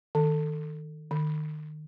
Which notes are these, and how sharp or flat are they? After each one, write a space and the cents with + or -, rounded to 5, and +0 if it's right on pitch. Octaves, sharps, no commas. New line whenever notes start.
D#3 +0
D#3 -30